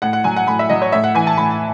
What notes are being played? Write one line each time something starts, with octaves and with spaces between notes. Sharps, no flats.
A2 F#5
F#5
F#3 G#5
F#5
A2 B5
E5
F#3 D#5
C#5
A2 E5
F#5
E3 G#5
A5
A2 B5